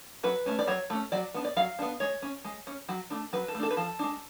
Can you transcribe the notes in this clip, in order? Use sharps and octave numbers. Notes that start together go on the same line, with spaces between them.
F#3 B4
A3 C#4
D5
F#3 C#5
A3 C#4
F#3 D5
B3 D4
D5
F#3 F5
B3 D4
G#3 C#5
C#4
G#3
C#4
F#3
A3 D4
F#3 B4
A4
A3
D4 A4
B4
F3 A4
G#3 D4